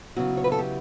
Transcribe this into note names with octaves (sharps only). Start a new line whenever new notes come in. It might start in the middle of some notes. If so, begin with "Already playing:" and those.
C#3 F#3 B3 E4 F#4
C#5
B4
A4
G4